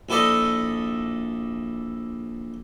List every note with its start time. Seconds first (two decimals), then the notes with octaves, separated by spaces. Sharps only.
0.09 A#1 E4 A4 D5 D#5